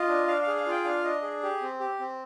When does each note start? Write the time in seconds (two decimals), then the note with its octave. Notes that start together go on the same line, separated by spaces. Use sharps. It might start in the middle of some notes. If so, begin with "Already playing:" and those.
Already playing: F4 D#5
0.08 D4
0.27 D4 F5
0.42 F5
0.47 G#4
0.56 F5
0.66 F4 G5
0.84 D4 F5
1.04 D4 D#5
1.23 G#4
1.43 G4
1.62 C4
1.80 G4
1.99 C4